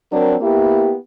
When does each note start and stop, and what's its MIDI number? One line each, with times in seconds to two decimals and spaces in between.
0.11 0.35 54
0.11 0.35 60
0.11 0.35 62
0.11 0.35 70
0.41 0.94 58
0.41 0.94 59
0.41 0.94 64
0.41 0.94 67